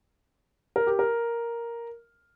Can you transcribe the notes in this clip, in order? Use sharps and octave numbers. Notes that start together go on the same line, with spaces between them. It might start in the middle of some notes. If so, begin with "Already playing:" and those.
A#4
G4
A#4